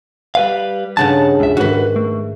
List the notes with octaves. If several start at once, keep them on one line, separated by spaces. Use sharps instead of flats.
G3 B4 F5
G2 C#3 D#4 F#5 A5
C#2 E5
G#2 D#3 F#4 B4
A3